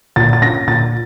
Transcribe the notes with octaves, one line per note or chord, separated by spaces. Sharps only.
A#2 A6
A6
C#4 A#6
A#2 A6